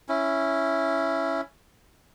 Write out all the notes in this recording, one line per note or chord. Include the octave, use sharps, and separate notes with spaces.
C#4 E4